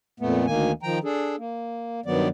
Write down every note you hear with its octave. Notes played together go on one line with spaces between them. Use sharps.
F2 A#2 A3 B3
D2 D#3 A#3 G#5
D#3 F3 G5 A#5
D4 G#4 A4
A#3
G2 D#3 F#3 B3 D5